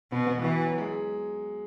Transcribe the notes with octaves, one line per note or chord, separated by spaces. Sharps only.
B2 B3
B3
E3 F#4
F#3
G#3